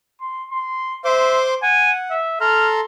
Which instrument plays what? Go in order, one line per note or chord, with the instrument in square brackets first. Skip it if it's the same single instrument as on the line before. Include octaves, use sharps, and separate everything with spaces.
[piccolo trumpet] C6
C6
[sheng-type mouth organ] C5 C6 D6 [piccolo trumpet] E5
[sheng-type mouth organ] F#5 [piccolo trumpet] G#5
[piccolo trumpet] E5
[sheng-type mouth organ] A4 A#5 C6 [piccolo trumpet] F6